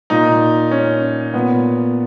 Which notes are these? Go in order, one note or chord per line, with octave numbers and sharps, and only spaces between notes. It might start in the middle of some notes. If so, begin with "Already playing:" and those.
A#2 D#4
C#4
A#2 B3